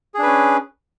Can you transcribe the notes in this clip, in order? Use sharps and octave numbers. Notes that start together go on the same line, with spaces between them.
C#4 D4 G#4 B4